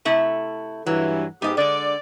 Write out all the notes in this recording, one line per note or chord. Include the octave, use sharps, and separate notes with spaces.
C3 A3 E4
G2 E3 F#3
G#2 B3 G4 D#5
D3 G#3 D5